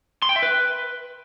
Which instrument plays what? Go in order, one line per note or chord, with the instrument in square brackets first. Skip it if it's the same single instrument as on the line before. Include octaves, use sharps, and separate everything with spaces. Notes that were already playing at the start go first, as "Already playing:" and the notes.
[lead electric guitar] C6
G5
E5
B4